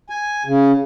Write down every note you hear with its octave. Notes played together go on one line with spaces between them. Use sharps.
G#5
C#3